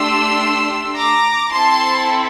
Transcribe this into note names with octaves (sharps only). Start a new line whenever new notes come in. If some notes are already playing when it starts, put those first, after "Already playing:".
Already playing: A3 D4 G4 C6 E6
A#5 D6
C4 E4 A4 A5 C6